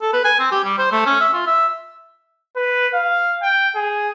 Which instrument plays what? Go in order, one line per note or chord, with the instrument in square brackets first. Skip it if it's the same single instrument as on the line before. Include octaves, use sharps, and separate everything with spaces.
[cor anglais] A4
B4
G#5
C4
G4
G3
C5
A3
C#4
E5
F4
E5
[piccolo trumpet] B4
F5
G5
G#4